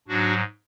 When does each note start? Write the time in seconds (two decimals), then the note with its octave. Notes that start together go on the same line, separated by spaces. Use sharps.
0.08 G#2 F#3 D4 F#4